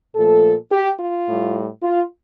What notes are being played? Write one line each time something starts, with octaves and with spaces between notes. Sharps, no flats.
A#2 F3 A3 A4
G4
F4
A2 G3
F4